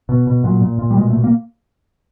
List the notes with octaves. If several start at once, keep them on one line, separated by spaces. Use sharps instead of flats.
B2
B2
A#2 F#3
A#2
A#2
G3
B2 G#3
A3
B2
A#3